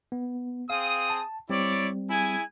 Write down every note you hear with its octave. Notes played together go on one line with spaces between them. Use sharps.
B3
C4 G#4 F5 D#6
A5
G3 C4 E4 C#5 D5
E4 G#4 G#5